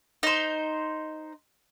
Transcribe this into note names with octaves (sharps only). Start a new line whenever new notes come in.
D#4 C5